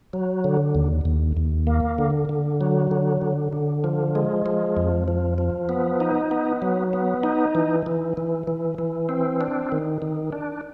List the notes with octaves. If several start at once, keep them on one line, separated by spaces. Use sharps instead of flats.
F#3
D3
D#2
D#2
D#2
A#3
D3
D3
F#3
D3
D3
D3
F3
G#3
F3
F2
F3
F3
B3
D#4
B3
F#3
B3
D#4
E3
E3
E3
E3
E3
C4
D4
D#3
D#3
D4